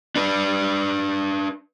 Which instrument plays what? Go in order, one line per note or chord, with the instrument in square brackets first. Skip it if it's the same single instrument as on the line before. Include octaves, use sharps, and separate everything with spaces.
[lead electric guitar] D4 B4